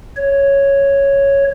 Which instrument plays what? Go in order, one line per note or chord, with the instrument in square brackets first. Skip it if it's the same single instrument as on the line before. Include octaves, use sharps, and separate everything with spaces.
[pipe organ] C#5